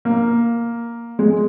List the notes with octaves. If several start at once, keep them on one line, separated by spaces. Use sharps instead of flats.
A#3
G#3